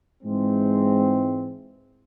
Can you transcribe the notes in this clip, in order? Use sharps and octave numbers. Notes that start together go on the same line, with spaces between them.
G#2 E3 G#3 C4